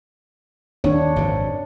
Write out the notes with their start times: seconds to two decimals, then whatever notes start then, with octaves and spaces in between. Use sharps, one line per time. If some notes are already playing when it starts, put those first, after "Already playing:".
0.84 D#2 D4 C#5
1.16 G#1 F#2 C3